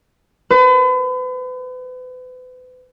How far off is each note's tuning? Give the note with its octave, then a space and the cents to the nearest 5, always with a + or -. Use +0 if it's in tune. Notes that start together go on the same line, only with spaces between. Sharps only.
B4 +40